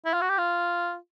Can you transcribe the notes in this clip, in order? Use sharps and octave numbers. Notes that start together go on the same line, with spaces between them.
E4
F4
F#4
G4
F4